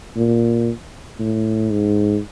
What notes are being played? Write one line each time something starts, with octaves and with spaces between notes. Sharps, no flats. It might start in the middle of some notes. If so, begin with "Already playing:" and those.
A#2
A2
G#2